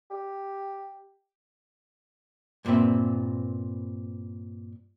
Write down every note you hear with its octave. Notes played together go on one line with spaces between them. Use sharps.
G4
G2 A#2 B3 C4 E5